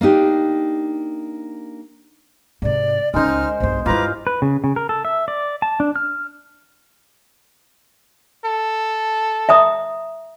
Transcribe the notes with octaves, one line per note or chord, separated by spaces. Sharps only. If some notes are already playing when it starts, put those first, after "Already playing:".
A#3 D4 D#4 G4
G#2 C3 D5
C#2 G#3 C#4 D#4 C5 F6
B1 G2 C5
G2 E4 F4 B4 C5 A#5 D6
B4
C#3
C#3
A#4
A4
E5
D5
A5
D4
F6
A4
E5 A#5 D#6